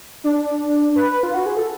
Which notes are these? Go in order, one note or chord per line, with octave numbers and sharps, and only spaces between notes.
D4
B4
F4
F#4
G#4
A4